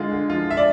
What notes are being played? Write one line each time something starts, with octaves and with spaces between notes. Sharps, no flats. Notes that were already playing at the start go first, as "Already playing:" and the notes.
Already playing: D3 G#3 F4
D3
F3 F4
D3 E5
D5